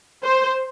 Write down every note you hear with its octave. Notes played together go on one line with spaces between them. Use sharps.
C5